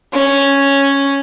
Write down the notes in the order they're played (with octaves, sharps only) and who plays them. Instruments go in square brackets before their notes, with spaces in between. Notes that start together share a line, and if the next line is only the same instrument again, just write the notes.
[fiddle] C#4